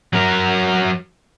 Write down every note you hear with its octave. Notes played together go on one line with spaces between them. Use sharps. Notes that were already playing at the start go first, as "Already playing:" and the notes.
F#3 A#4